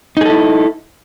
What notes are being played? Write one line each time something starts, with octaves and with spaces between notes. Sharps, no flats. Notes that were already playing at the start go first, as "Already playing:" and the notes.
D#4 E4 G#4 A4